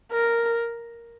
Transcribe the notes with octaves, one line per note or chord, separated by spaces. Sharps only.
A#4